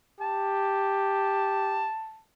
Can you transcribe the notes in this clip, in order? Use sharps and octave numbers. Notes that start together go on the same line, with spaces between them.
G4 A5